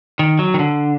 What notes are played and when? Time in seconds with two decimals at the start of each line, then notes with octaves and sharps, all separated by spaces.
0.19 D#3
0.39 F#3
0.54 D#3
0.59 D3